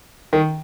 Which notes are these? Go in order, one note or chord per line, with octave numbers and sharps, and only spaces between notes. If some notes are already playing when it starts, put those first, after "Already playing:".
D#3